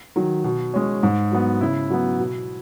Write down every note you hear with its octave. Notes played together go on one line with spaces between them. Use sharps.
D#3 F#3
B2
G#3 C#4
G#2
F#3 B3
C#3 E4
F#3 B3
B2